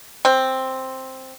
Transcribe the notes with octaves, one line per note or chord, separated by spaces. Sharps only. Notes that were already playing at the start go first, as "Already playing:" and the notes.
C4